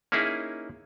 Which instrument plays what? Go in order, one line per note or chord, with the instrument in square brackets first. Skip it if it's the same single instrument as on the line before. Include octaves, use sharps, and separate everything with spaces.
[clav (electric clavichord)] A#3 C#4 D#4 E4 G#4